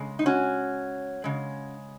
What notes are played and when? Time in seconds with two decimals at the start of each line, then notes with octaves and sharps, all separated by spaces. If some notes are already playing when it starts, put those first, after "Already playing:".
Already playing: C#3 G#3
0.19 D#4
0.26 C#4 F#4
1.24 C#3 G#3